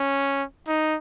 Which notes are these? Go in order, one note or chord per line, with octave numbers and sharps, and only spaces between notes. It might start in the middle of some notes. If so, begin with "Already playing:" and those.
Already playing: C#4
D#4